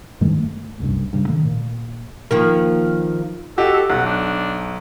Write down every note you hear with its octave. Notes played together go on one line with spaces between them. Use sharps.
G2 D#3 G#3 A3
A3
F#1 C2 G2
G2 C#3
D3 D#3 A3
A#2
D#3 F3 A#3
F#4 G4 A4 D#5
A4
B1 F#5
D4